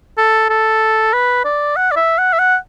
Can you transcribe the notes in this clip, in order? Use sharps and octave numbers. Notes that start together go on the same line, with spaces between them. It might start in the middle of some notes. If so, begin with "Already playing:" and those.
A4
A4
B4
D5
F#5
D5
E5
F#5
E5
F#5